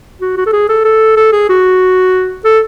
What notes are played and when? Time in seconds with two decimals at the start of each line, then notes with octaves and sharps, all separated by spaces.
0.21 F#4
0.37 F#4
0.46 A4
0.53 G#4
0.69 A4
0.85 A4
1.17 A4
1.33 G#4
1.49 F#4
2.45 A4